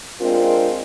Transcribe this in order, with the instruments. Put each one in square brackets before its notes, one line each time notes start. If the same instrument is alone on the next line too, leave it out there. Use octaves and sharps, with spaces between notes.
[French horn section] G#3 C4 D4 F4 A#4